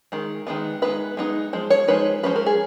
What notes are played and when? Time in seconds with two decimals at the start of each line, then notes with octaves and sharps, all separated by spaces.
0.12 D#3 G#3
0.47 D#3 G#3 B3
0.82 G#3 B3 D#4 B4
1.17 G#3 B3 D#4
1.53 F3 G#3
1.70 C#5
1.88 F3 G#3 D#4 B4
2.23 F3 G#3 C#4 B4
2.36 A#4
2.46 G#4